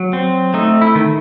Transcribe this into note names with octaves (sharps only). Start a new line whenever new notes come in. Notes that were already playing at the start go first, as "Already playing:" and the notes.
Already playing: F#3
C4
A3 D#4
E4
D#3